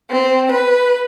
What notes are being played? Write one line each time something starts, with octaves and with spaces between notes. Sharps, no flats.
C4
B4